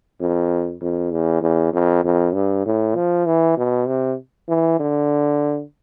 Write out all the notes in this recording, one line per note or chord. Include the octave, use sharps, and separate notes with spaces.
F2
F2
E2
E2
F2
F2
G2
A2
F3
E3
B2
C3
E3
D3